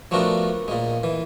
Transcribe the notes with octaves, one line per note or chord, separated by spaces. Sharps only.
F3 A3 B3 D4 F#4 A#4
A#2 G#3
E3